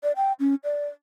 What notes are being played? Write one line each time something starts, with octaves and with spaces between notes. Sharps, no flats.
D5
G5
C#4
D5